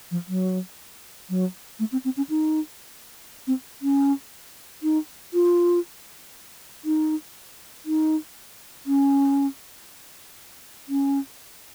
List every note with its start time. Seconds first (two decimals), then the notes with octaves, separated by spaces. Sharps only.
0.11 F3
0.28 F#3
1.30 F#3
1.80 A3
1.92 C4
2.05 C4
2.17 C#4
2.29 D#4
3.47 C4
3.82 C#4
4.83 D#4
5.34 F4
6.85 D#4
7.86 D#4
8.86 C#4
10.89 C#4